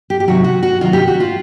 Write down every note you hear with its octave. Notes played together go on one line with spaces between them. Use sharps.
G4
G4
C3 D#3 F#3 F#4
F#4
F#4
C3 D#3 F#3 F4
G4
F#4
F4